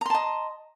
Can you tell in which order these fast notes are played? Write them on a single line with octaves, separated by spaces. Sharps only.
A#5 C6 A5 D#5